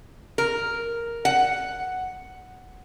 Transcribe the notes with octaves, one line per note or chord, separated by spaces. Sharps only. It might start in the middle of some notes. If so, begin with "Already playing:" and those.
A#4
F#5